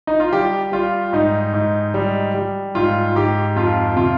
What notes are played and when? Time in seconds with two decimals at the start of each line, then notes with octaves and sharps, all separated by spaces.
0.07 D#4
0.20 F4
0.33 G3 G4
0.72 G3 F4
1.13 G#2 D#4
1.54 G#2
1.94 G3
2.34 G3
2.75 G#2 F4
3.16 G#2 G4
3.56 F2 F4
3.97 C3 F4